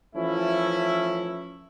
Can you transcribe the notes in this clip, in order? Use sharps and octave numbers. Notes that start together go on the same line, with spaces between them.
E3 F3 A3 C#4 E4